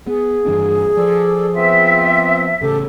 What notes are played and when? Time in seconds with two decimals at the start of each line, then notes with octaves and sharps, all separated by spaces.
0.07 B3 G#4
0.46 G2 E3 D4
0.97 F3 A4 D5
1.54 B3 C4 F4 E5
2.61 A1 C#3 G4 A4